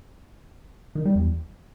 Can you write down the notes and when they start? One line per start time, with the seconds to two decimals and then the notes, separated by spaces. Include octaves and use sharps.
0.95 D#3
1.05 G3
1.15 E2